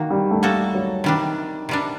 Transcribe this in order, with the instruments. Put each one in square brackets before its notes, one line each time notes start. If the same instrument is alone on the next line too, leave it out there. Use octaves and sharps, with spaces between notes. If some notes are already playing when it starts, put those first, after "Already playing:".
Already playing: [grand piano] D#3 [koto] A#3 F#4
[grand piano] G3
A3
[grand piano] G3 [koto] A#3 F#4 A4
[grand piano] F#3
[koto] C3 G3 D4 [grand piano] D#3
[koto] C3 G3 D4